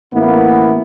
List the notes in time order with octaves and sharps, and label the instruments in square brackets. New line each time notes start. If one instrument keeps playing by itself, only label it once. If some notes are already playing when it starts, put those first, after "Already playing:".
[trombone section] A1 A#3 B3 E4